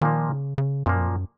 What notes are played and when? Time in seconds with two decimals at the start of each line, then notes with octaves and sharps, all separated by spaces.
0.01 A#2 D#3 F3 A#3
0.29 C#3
0.58 C#3
0.86 F#2 A#2 F3 A#3
1.00 F2
1.07 F#2